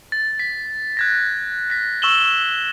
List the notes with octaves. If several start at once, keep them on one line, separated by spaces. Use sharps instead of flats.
A6
B6
F#6 G#6 A#6
A#6 B6
C#6 E6 E7 F#7 G7